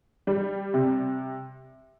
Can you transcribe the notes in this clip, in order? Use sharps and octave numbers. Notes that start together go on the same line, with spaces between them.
G3
C3